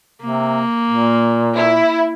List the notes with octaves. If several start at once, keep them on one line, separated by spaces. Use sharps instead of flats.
C3 A#3
A#2
E4